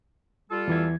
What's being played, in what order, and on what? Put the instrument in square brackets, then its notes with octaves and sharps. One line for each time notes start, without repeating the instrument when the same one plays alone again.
[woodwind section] G3 F4 A4
[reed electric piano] E2 E3 G#6